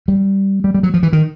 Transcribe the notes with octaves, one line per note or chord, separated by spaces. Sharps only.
G3
G3
G3
F#3
F3
E3
D#3